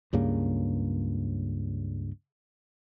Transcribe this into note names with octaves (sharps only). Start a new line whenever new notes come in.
C#2 G2 C#3 A#3